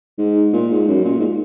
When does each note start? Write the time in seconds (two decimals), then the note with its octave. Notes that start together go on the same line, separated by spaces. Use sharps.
0.18 G#2
0.53 A#2
0.71 G#2
0.88 F#2
1.05 A#2
1.19 G#2